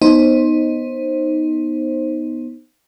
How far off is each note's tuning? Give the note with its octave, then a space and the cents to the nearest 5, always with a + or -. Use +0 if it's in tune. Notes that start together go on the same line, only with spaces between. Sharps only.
B3 +0 D#4 +0 C5 +15